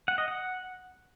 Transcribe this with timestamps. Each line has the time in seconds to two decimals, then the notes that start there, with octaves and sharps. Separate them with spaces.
0.08 F#5
0.18 D#5
0.28 F#5